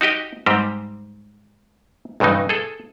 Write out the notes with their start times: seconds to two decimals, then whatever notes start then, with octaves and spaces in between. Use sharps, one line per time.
0.01 D#4 F#4 G4 D#5
0.46 G#2 G3 C4 G4
2.20 B1 G2 C#3 E3 D#4
2.49 G#4 A4